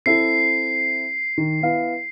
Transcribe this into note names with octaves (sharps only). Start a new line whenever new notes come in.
C4 E4 A4 C7
D#3
B3 E4 F5